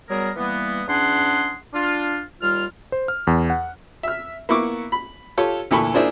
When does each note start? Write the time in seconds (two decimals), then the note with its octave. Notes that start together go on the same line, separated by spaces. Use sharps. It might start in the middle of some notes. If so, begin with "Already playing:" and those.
0.09 F#3 G3 B3 G#4 A#4
0.37 E3 G3 A#3 B3
0.88 E2 C#4 D4 G#4 F#5 C6
1.74 D4 F4
2.41 D#2 G3 F4 F6
2.92 C5
3.08 F6
3.27 E2
3.50 F#5
4.03 E5 F6
4.49 A#3 B3 E4 C#6 D6
4.92 B5
5.38 F4 G4 A4 C#5
5.71 D2 A#2 E3 A4 B5 C#6
5.94 A#3 D4 E4 F4 G#4 C5